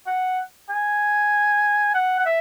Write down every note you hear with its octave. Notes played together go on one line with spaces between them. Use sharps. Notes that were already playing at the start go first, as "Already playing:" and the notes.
F#5
G#5
F#5
F#5
E5